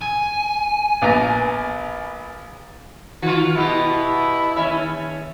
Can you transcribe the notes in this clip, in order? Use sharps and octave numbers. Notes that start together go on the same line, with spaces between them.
G#5
A#1 B3 A#5
D#3 F4 F#4
B2 B3 E4 G4
D#2 C#4 E5